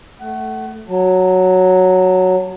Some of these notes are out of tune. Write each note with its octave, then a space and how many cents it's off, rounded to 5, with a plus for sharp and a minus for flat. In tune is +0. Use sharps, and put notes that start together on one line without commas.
A3 +0 F#5 +30
F#3 +0 A5 +15